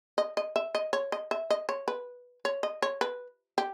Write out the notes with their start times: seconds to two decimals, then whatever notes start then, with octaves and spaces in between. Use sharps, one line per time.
0.18 D#5
0.37 D#5
0.56 E5
0.75 D#5
0.93 C#5
1.12 D#5
1.31 E5
1.50 D#5
1.69 C#5
1.88 B4
2.45 C#5
2.63 D#5
2.82 C#5
3.01 B4
3.58 G4